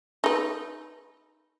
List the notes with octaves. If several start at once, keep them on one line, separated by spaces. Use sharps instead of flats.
D#4 B4